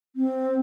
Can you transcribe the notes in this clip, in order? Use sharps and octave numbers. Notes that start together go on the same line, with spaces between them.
C4